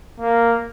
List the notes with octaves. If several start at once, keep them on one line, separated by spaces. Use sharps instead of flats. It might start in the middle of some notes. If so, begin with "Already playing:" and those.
A#3